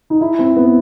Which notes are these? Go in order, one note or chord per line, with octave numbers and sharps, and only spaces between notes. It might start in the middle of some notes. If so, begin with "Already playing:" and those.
D#4
E4
C4
B3